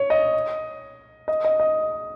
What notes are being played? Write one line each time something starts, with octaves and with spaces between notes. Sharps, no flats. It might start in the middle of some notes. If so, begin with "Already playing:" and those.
Already playing: C#5
D#5
D#5
D#5
D#5